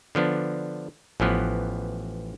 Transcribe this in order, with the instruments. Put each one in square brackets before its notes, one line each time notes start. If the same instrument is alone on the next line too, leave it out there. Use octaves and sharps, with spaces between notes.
[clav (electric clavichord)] D3 F3 B3 D4
A1 E3 F3 B3